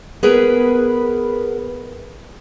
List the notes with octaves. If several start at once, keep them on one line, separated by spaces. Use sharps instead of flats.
B3 G#4 A#4 B4